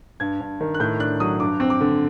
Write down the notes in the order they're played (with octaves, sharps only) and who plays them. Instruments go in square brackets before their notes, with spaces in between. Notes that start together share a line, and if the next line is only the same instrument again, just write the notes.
[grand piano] G2 G#6
G2
D#3
F#6
A2 G6
D4 F#6
F#3 D#6
G2 D6
C4
D6
D3